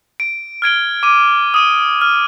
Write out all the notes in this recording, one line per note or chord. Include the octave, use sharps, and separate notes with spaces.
D7
F6 G#6 D7 G7
D6 D#7
D#6 D#7 G7
F6